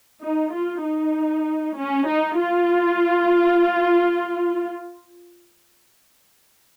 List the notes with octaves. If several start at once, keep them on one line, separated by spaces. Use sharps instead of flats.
D#4
F4
D#4
C#4
D#4
F4